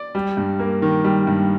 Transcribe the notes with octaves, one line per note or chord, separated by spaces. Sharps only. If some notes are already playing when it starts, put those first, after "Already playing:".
Already playing: D5
G3
G2
A#3
D#3
G3
G2